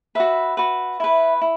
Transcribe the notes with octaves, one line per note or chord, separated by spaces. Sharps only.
F#4 B4 E5
F#4 B4
E4 B4
E4